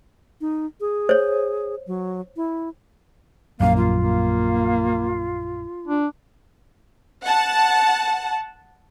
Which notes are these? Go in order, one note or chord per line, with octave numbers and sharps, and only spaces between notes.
D#4
G#4
C5 C#5
F#3
E4
A#1 F#2 A#3 F5
F4
A#3
D4
F#5 A5